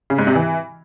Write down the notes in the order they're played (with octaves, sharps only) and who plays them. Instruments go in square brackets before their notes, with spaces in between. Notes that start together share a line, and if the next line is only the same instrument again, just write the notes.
[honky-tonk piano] C#3
G#2
C3
E3